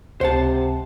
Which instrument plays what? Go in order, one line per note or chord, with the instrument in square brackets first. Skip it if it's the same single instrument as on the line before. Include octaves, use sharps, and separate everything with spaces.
[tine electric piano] C#2 [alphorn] C3 [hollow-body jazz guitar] C5 F#5 A5